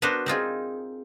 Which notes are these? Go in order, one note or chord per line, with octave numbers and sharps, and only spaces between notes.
B3 D4 F#4 A#4 C5
C4 D#4 F4 G#4